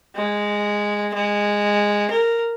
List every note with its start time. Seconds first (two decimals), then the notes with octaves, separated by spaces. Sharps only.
0.16 G#3
1.14 G#3
2.11 A#4